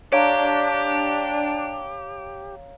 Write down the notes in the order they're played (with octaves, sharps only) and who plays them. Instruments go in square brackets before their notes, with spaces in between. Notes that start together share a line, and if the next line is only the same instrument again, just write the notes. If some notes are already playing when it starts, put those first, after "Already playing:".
[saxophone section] D4 [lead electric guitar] G4 [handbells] C#5 F5 A#5